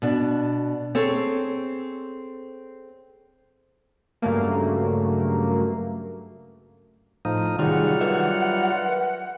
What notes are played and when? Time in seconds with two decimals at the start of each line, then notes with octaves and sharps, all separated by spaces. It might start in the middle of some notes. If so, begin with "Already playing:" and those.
0.02 B2 D4
0.95 C4 G#4 A4 C#5
4.22 G2 C#3 F#3 A3 A#3
7.25 A2 F3 D#4
7.59 C2 D#3 F#3 G3 F4 G#4 F#5
8.01 A#4 B4 E5